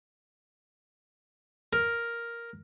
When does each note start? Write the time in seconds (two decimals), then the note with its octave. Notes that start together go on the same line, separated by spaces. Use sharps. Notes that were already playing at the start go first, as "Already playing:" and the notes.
1.73 A#4